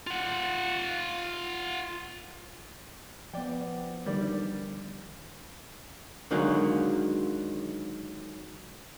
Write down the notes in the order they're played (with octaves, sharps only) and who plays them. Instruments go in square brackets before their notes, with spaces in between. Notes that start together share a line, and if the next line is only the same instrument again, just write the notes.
[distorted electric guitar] F4 F#5
[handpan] F3 B3 [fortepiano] D5 G5
[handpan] D3 D#3 [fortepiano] G3 D5
[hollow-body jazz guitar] D3 D#3 F#3 G#3 A#3